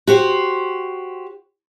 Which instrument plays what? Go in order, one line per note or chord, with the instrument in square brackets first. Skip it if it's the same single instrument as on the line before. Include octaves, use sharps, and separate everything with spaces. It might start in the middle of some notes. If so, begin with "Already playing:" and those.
[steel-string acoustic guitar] F#4 G4 C5